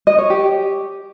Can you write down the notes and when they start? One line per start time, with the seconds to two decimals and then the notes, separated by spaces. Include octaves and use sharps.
0.07 D#5
0.18 C#5
0.30 G4